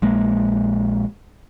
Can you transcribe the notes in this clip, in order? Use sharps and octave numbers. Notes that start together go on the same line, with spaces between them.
A#1 G#3 A#3